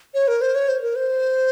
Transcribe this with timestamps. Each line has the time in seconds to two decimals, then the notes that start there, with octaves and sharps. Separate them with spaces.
0.14 C#5
0.28 A#4
0.42 C5
0.55 C#5
0.69 C5
0.82 A#4
0.96 C5